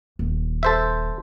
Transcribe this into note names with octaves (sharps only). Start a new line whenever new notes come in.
D#1
A4 C5 E5